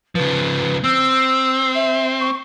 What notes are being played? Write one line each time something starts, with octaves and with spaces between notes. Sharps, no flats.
C#3 F3 B4
C4 E6
E5
C#6